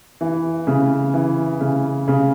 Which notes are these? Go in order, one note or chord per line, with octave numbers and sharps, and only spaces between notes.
E3
C#3
E3
C#3
C#3